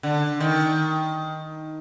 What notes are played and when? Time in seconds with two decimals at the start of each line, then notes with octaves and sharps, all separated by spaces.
0.03 D3
0.40 D#3